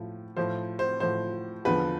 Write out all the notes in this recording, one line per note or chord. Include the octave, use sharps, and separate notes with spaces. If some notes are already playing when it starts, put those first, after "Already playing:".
Already playing: A2 F3
A2 F3 C5
C5
A2 F3 C5
E2 D3 F3 B4